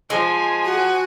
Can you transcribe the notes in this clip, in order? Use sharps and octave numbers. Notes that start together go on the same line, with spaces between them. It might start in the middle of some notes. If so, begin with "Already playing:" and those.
F3 G#3 G#5
F#4